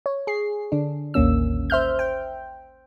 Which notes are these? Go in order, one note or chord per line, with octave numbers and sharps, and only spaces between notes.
C#5
G#4 C7
D3 D4
A1 D#2 A#3 C#4 E6
C5 E5 F6 G6
G5